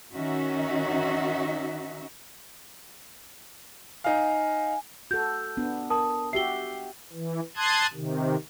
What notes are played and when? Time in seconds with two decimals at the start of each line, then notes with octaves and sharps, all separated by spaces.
0.13 D#3 C#4 D#4 F#4 E5
4.04 D#4 F5 G#5
5.11 F#4 A4 G6
5.57 B3 D4
5.90 A#4 A5 D#6
6.33 F#4 G4 E5 C7 G7
7.13 E3
7.56 A5 C6 D#6 F#6 G#6
7.93 C3 D#3